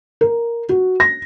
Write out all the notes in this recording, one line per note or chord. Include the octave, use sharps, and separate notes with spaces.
A#4
F#4
A#6